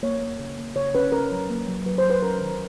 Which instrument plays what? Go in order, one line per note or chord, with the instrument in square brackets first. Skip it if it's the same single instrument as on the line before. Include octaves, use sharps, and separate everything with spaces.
[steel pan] A#3 C#5
A#3
C#3
A#3
C#3 C#5
C#4 B4
C#4 A#4
F#3
A#3
F#3
F#3 B4
C5
F#3
B4
C#4 A#4
D#3